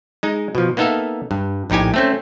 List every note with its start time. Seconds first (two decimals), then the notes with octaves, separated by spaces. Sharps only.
0.23 G#3 D#4
0.55 B2 F3
0.77 A#3 B3 D#4 A4 E5 F5
1.31 G2
1.70 A#1 A2 D#4 G4 G#5
1.94 A3 C4 C#4